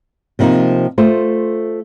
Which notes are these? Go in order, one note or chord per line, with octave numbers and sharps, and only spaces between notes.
C3 F3 A#3 D#4
A3 F4 C5